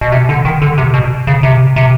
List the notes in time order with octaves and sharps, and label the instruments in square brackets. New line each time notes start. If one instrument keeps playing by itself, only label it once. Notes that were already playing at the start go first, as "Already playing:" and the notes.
[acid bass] B2
C3
D3
D#3
D3
C3
B2
C#3
C3
C3